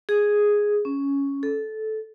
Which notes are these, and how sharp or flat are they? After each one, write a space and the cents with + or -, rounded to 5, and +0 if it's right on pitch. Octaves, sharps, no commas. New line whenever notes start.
G#4 +0
C#4 +5
A4 -15